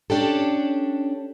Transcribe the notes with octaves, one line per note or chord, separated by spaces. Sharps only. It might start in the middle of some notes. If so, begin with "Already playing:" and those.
C#4 D4 G4 A4